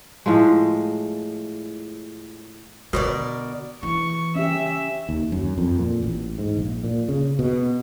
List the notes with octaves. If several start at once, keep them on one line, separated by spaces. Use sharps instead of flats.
A2 F3 G#3
B2 D3 A#4 C5 D5
E3 C#6
C#4 G4 E5
D#2
F#2
F2
A#2
A1
G#2
A#1
A#2
C#3
B2